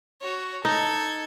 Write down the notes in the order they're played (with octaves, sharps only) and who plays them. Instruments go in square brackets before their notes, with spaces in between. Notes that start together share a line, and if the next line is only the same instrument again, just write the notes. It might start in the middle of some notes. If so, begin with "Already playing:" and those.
[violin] F#4 C#5
[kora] D#4 [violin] A4 G#6